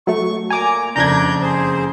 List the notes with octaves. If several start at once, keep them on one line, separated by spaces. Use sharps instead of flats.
F#3 A3 C#6
A#2 G#5 A#5 D6
F#1 F2 D4 D5 A#5 G6 G#6 A#6
G#4 C5